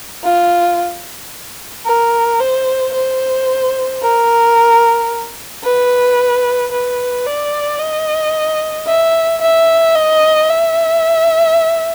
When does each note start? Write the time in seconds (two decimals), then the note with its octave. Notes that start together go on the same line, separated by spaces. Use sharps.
0.23 F4
1.85 A#4
2.40 C5
2.94 C5
4.02 A#4
5.64 B4
6.72 B4
7.26 D5
7.79 D#5
8.87 E5
9.42 E5
9.95 D#5
10.50 E5